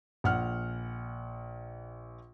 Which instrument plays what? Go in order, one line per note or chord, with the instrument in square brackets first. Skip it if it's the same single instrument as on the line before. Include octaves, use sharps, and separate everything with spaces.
[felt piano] A#1 F#5 F6